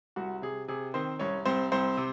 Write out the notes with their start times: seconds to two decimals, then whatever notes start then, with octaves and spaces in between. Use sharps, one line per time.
0.16 C2 F#4
0.42 C3 G#4
0.68 C3 G#4
0.94 D#3 C4 C5
1.19 C2 C#4 C#5
1.45 C2 C4 C5
1.72 C2 C4 C5
1.97 C3